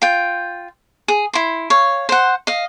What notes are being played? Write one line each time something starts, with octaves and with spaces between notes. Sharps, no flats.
F4 G5
G#4
E4 C6
C#5 F5
C5 F#5
D#5 F5